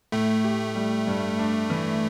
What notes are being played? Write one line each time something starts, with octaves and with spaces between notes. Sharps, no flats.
A2 A3
G4
G3
G2
D4
E3